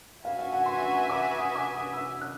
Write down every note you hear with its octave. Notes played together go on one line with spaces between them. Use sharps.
F#4 B4 E5 F5 G#5
F5
F#5
C6
C#6
D6
D#6
D6
D#6
E6
F#6